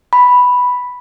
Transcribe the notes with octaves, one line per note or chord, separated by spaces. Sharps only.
B5